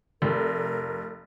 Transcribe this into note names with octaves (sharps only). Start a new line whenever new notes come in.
F1 A#4